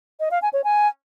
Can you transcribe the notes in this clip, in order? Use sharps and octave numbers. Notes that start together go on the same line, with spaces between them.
D#5
F5
G#5
C#5
G#5